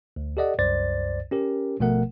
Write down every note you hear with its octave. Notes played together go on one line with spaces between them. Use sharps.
D2
G4 A4 D5 D#5 F#5
C2 F#2 C5 D5 A6
C#4 G4 A#4
G#1 B2 F3 A3 A#4 F#5